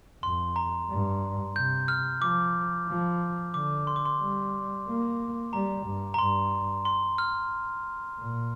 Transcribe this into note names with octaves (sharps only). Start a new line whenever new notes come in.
F2 C6
A#5
G2
C3 G6
F6
F3 D6
F3
D3 D6
C6
D6
C6
G3
A#3
G3 A#5
G2
A#5
G2 C6
C6
F6
A#2